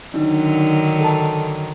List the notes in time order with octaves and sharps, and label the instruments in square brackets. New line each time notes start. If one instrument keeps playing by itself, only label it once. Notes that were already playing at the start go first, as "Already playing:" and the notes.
[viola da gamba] D3 D#3 F#3 [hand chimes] D4 D#4
[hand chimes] A4 A5